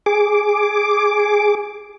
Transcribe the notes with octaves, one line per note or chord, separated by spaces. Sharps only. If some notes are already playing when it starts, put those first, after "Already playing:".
G#4 D6